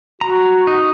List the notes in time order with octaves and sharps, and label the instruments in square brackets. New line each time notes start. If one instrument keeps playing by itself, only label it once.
[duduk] F#4 [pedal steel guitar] A#5
[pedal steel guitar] D#4